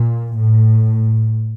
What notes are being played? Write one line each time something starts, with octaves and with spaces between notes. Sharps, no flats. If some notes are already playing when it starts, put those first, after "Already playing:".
Already playing: A#2
A2